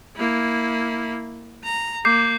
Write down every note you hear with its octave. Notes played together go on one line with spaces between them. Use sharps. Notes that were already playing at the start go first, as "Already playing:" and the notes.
A#3 E4
A#5
A#3 D6 G6 C7